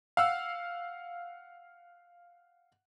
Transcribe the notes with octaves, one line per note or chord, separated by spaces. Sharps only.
F5 F#5 E6